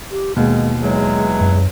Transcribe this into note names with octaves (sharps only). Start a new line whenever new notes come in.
G4
D#2 B2 G#3
E2 F#3 G#3
F#2